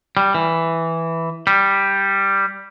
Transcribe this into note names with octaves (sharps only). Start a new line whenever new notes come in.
G3
E3
G3